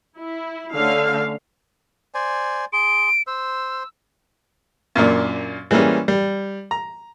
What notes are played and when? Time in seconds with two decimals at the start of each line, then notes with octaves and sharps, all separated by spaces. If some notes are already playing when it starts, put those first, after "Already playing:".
0.18 E4
0.74 D3 A3 C#4 F5
2.14 C5 D5 G#5
2.73 G#4 C6 D7
3.27 C5 E6
4.95 F#2 A#2 A#3 D4
5.71 E3 G3 G#3 A#3 C#4
6.08 G3
6.71 A#5